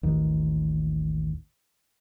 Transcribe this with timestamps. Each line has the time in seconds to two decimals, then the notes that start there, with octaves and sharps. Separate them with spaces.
0.03 A1 D#2